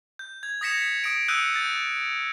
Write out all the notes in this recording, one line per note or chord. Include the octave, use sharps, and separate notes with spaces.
G6
G#6
D#6 G#6 A#6 B6 C#7 E7
D#6 A#6 D7
D#6 E6 F#6 G6 C#7 D#7
G6 A6